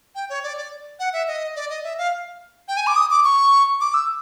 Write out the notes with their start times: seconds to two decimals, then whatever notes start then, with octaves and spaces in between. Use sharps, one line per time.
0.15 G5
0.30 C#5
0.43 D5
0.57 D5
0.99 F#5
1.13 E5
1.27 D#5
1.56 D5
1.70 D#5
1.84 E5
1.98 F5
2.68 G5
2.77 G#5
2.87 D6
2.96 D#6
3.10 D6
3.24 C#6
3.81 D6
3.94 E6